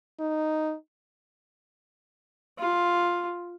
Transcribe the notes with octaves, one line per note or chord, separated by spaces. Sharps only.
D#4
F4